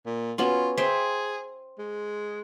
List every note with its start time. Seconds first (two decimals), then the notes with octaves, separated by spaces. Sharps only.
0.06 A#2
0.38 B3 C#4 F4 F#4
0.77 G#4 C5 E5 G5
1.79 G#3